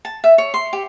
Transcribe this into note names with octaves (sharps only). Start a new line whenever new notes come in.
A5
E5
C#5
C6
G4